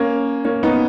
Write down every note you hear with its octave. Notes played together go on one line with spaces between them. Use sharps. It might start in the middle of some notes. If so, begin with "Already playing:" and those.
Already playing: A#3 C#4
A#3 C#4
B3 D#4